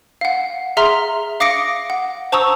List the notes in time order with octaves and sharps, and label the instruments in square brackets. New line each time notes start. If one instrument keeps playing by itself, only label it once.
[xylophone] F5 F#5
G#4 E5 A#5 C6 F6
F5 D6 D#6 A#6 C#7 D7
F#5
C5 A5 A#5 C#6 D#6 E6